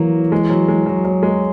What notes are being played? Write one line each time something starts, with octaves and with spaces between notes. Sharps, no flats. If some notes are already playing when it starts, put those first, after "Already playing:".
Already playing: E3 F#3 A#3
G#3
F#3
G#3
F#3
F#3
G#3